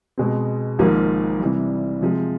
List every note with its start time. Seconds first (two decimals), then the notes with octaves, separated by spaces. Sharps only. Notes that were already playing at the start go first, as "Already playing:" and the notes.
0.18 B2 G#3 C4
0.79 G#1 G#2 F3 A#3
1.40 C3 E3 G3
2.01 C3 F3 G#3